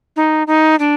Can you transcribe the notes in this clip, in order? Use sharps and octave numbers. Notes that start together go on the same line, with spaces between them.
D#4
D#4
D4